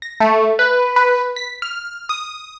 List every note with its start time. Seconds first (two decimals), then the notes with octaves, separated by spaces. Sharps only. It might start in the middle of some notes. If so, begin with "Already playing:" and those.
0.02 A#6
0.20 A3
0.59 B4
0.96 B4
1.36 B6
1.62 F6
2.09 D#6